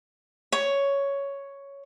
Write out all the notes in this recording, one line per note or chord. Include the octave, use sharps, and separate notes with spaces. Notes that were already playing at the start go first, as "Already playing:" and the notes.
C#5